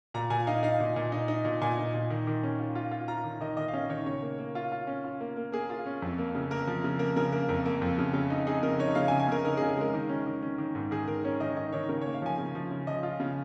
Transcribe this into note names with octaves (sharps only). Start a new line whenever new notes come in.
A#2 A#5
A#2 G#5
D#4 F5
D#4 F5
A#2
A#2
D#4
D#4
A#2
A#2 G#5
D#4
A#2
D#3
D#3
C#4
F4
F4
F4
F4 A#5
D#3
D#3 D#5
D#3 D#5
F5
C#4 D#5
D#3 C#5
C#3 C#5
A#3
A#3
F4
F4
C#4
F4
A#3
A#3
A#3 G#4
F4
C#4
F2
A#3
C#3
A#3 A#4
F3
C#3
A#3 A#4
C#3 A#4
A#3 A#4
F2 A#4
A#3
F2
C#3
C#3
D#4
D#4 G#4
C#3 A#4
D#4 C#5
C#3 F5
G#5
C#3
G#5
C#3 A#4
D#4 A#4
G#4
C#3
G#4
G#3 A#4
D#3
C#4
D#3
C#4
D#3
G#2
D#3 G#4
D#3 A#4
C#4 C#5
D#3 D#5
D#3 D#5
D#3 C#5
C#3 A#4
C#5
A#3
F5
F3 G#5
C#3
F3
C#3
F3 D#5
F4
C#3